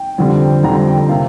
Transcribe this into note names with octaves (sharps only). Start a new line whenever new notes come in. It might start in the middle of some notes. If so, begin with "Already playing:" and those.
Already playing: G5
F2 D3 G3 C4
F2 D3 G3 C4 A#5
A#5
G5
G5
C3 A#3 F5